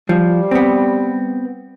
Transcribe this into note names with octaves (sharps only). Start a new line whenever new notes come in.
F3 G3
B3 C4